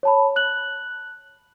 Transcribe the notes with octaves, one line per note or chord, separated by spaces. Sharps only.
C#5 A5 B5
F#6 F#7